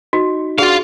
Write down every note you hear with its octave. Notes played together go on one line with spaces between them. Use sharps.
D#4 F#4
D4 F4 F#4 G#4 F5